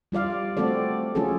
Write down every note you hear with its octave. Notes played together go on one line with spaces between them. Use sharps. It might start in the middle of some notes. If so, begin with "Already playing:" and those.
G3 F4 D5 F5
A3 C4 F#4 A4 D5
F#3 C#4 F4 G#4 A4